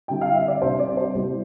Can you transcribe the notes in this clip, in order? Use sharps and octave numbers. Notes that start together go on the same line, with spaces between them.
D3 G3 C4 E4 G5
F5
E5
D5
C2 C3 G3 D4 C5
D5
C5
C2 C3 G3 B3 E4